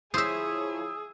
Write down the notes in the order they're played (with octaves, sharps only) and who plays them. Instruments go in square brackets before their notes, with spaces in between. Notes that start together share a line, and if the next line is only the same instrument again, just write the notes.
[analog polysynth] F3 E4 C#5 [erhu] G#4 [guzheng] C5 E5 [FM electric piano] D#6 E6